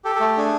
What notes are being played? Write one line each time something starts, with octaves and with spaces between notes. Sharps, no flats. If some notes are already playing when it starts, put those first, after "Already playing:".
G4 A4
A4
A3
D4 G#4